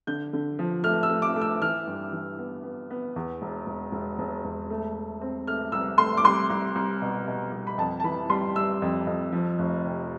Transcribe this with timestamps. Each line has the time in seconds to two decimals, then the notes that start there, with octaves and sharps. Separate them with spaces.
0.07 D3 G6
0.33 D3
0.59 F3
0.84 A3 F6
1.03 E6
1.10 A3
1.22 D6
1.36 A3
1.41 E6
1.62 E3 F6
1.87 G2
2.12 E3
2.39 B3
2.64 B3
2.90 B3
3.16 E2
3.42 E1
3.67 E1
3.92 E1
4.19 E1
4.44 E1
4.70 A3
4.95 A3
5.21 C4
5.47 A3 F6
5.72 C2 E6
5.98 A3 C6
6.17 D6
6.24 C2 C6
6.50 C2
6.76 C2
7.02 B2
7.28 B2
7.52 C2
7.67 B5
7.78 F2 A5
8.00 A5
8.04 E3 B5
8.30 G3 C6
8.56 G3 E6
8.82 F2
9.07 F2
9.32 F3
9.59 F1
9.84 C3